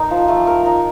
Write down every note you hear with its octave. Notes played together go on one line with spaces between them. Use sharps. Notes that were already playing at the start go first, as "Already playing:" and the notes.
Already playing: D#4 A#4
F3
A3
A#4
D#4